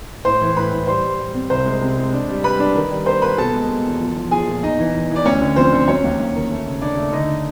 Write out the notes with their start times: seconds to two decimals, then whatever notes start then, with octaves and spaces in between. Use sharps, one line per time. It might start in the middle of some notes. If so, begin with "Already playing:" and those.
0.25 A2 C5 C6
0.41 E3
0.57 A2 B4 B5
0.72 A2
0.87 G3 C5 C6
1.03 G3
1.20 G3
1.34 C4
1.50 C2 C5 C6
1.65 G#3
1.81 C3
1.97 G#3
2.13 D4
2.29 G3
2.44 G3 B4 B5
2.59 D4
2.76 D#3
2.92 G3
3.06 A#3 C5 C6
3.22 A#3 B4 B5
3.38 B2 A4 A5
3.53 G#3
3.69 G#3
3.85 E2
4.00 F3
4.16 F3
4.31 F3 G#4 G#5
4.47 A#2
4.63 E2 D#4 D#5
4.79 E3
4.94 E2
5.10 E3
5.16 D5
5.25 D2 C#4 C#5
5.41 D3
5.56 F3 C4 C5
5.72 D3
5.88 F#3 C#4 C#5
6.04 D#2
6.20 D#2
6.35 D#3
6.51 A3
6.67 C#3
6.81 C#3 D4 D5
6.97 A3
7.12 D3 D#4 D#5